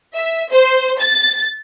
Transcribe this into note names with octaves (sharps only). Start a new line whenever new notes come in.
E5
C5
A6